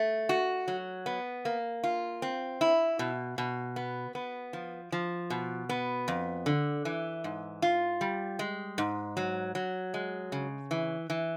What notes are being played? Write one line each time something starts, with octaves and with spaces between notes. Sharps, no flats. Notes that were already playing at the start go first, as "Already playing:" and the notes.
Already playing: A3
F#4
F#3
B3
A#3
F4
C4
E4
B2
B2
B3
B3
F3
F3
B2
B3
F2
D3
E3
G#2
F4
G3
G#3
G#2
F#3
F#3
G#3
C#3
E3
E3